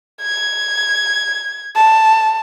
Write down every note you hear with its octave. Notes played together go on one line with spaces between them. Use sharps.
G#6
A5